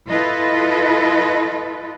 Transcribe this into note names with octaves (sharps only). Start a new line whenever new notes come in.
E4 F4 A4 B4 D#5